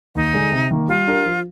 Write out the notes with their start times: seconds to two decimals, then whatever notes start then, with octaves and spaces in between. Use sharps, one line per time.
0.15 D#2 D#4
0.33 D3 G#3 D4 G#4
0.52 C3
0.71 D#3 A#3
0.88 G3 F4
1.07 D4 G4 A#4
1.26 F3